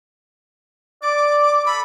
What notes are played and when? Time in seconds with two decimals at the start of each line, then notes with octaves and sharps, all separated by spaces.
1.02 D5 D6
1.66 A4 B5